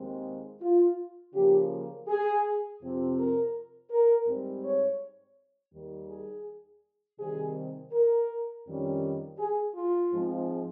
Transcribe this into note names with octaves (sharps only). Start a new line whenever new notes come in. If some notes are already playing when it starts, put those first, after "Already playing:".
Already playing: D#2 D#3 G#3 C4
F4
C#3 F3 A#3 G4
G#4
F2 C3 F3 C4
A#4
A#4
G#2 G3 C4
C#5
D#2 D#3 G3
G#4
C3 D#3 G3 C4 G#4
A#4
F2 D#3 G3 C#4
G#4
F4
G#2 F3 G#3 C4